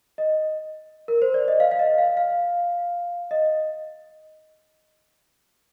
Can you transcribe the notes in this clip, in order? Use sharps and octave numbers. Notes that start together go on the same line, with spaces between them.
D#5
A#4
C5
D5
D#5
F5
F5
D#5
F5
F5
D#5